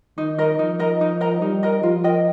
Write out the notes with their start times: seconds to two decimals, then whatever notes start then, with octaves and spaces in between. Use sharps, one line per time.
0.17 D#3 D#4
0.38 A#4 D#5 A#5
0.59 F3 D#4
0.79 A#4 D#5 A#5
1.01 D#4
1.21 A#4 D#5 A#5
1.41 G3 D#4
1.63 A#4 D#5 A#5
1.82 F3 F4
2.04 A#4 D#5 G5